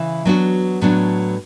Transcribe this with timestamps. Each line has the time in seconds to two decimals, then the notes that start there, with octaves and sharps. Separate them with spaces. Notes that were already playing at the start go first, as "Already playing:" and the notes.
Already playing: C#3 E3 E4
0.25 F#3 B3 D4 F#4
0.81 A2 F#3 B3 D4